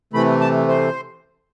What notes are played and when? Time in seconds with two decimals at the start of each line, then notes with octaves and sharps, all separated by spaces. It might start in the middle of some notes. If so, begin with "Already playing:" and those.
0.13 C3 E3 A3 B5
0.41 A5
0.68 C5